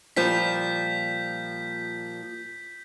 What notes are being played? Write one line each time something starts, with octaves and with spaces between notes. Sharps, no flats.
A#2 F3 G3 G6 B6